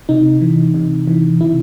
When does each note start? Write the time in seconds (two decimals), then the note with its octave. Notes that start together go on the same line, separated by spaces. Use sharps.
0.09 C3 D#4
0.41 E3
0.74 C3
1.07 E3
1.40 C3 E4